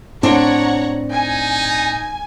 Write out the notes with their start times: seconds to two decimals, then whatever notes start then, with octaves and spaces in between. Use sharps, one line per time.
0.23 A2 C4 D4 C#5 F#5 A#5
1.10 D#4 G#5